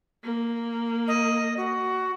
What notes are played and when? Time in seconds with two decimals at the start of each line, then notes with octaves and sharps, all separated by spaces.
0.24 A#3
1.07 D#5
1.57 F#4